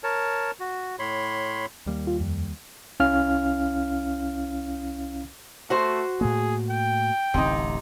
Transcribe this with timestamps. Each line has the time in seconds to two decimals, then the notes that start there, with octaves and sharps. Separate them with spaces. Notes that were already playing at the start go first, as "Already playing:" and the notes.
0.04 A#4 C#5 A5
0.60 F#4
0.99 A2 C#5 B5 C6
1.86 D#2 G3 A#3
2.07 F4
2.20 F2
3.00 C2 C#4 E4 F5 F6
5.70 A3 F#4 C5
6.21 A2 A3 A#3 G#4
6.70 G5
7.34 D1 A1 C3 D#4